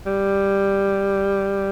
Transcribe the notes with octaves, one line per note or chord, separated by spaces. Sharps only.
G3